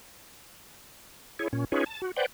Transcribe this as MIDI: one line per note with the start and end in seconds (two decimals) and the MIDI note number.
1.39 1.48 64
1.39 1.48 68
1.39 1.48 73
1.53 1.65 46
1.53 1.65 61
1.72 1.84 61
1.72 1.84 63
1.72 1.84 65
1.72 1.84 68
1.72 1.84 71
1.72 1.84 73
1.86 2.02 81
2.02 2.12 66
2.16 2.26 71
2.16 2.26 72
2.16 2.26 74
2.16 2.26 78
2.16 2.26 79